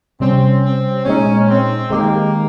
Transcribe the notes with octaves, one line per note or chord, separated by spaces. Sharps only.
C3 G3 C4 C#4
C4
A#2 G#3 C#4 D#4
C4
D#3 G#3 A#3 D#4 G4